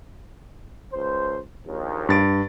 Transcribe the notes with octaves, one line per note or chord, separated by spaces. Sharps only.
C#2 C5
A#1 D#2
G2 A6 D7